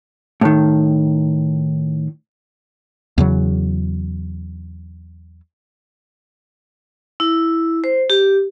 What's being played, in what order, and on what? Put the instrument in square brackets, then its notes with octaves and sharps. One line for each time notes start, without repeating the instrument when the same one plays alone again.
[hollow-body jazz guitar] A2 D#3
[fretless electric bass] E2 C#3 F#3
[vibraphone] E4
C5
G4